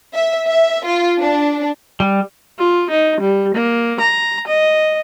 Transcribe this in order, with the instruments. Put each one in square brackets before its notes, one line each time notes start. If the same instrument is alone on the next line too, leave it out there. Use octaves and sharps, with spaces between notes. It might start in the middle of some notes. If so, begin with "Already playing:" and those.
[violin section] E5
E5
F4
D4
[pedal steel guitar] G3
[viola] F4
D#4
G3
A#3
A#5
D#5